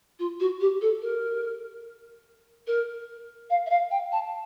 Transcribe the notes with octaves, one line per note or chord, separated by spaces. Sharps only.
F4
F#4
G4
A4
A#4
A#4
F5
E5
F5
G5
A5